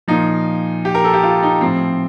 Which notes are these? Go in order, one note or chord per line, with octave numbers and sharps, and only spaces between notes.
A#2 F3 D#4
G4
A#4
A4
G4
F4
D#4
A2 F3 C4